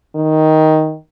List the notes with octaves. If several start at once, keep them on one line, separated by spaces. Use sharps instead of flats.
D#3